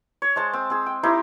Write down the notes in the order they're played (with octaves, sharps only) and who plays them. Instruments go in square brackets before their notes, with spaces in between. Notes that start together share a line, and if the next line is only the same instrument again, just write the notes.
[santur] C#5
G#3 C5 A5
C4
C4 G#4
G5
D#4 E4 G4 C5